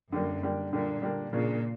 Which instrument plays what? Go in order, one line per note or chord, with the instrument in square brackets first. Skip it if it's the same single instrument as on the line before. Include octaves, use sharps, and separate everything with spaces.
[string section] F#2 [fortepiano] D3 G3 A#3 D4
[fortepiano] D3 G3 A#3 D4
[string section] A#2 [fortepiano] D3 G3 A#3 D4
[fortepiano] D3 G3 A#3 D4
[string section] A#2 [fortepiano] C#3 F3 A#3 D4